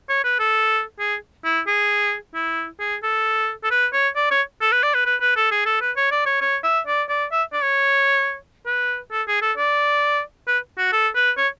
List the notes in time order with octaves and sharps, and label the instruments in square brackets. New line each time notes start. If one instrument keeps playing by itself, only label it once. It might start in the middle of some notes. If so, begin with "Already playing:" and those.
[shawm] C#5
B4
A4
G#4
E4
G#4
E4
G#4
A4
A4
B4
C#5
D5
C#5
A4
B4
D5
B4
B4
B4
A4
G#4
A4
B4
C#5
D5
C#5
C#5
E5
D5
D5
E5
D5
C#5
B4
A4
G#4
A4
D5
B4
F#4
A4
B4
C#5